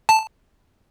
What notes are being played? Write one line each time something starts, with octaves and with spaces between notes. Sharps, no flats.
A5